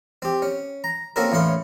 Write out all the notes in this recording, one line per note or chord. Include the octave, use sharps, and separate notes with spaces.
C4 G4
C#4
A#5
A#3 C4 C#4 F#4 A4 A#4
E2 A2 C#4 F5 C6